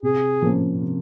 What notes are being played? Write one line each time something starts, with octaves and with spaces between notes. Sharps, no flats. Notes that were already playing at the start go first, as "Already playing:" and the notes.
C3 G#4
F3 A#3 C#4
C3